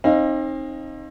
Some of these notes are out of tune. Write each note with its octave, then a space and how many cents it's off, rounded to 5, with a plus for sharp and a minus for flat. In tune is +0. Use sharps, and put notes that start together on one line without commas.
C4 +40 D#4 +0 F5 +0